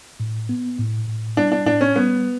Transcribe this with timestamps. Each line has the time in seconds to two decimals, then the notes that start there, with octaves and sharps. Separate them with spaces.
0.20 A2
0.49 B3
0.78 A2
1.08 A2
1.37 G3 D4
1.52 D4
1.66 A2 D4
1.81 C#4
1.96 G3 B3